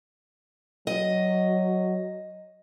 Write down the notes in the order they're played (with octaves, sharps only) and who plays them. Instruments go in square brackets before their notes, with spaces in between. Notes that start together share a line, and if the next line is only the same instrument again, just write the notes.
[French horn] F#3 [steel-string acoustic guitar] D#5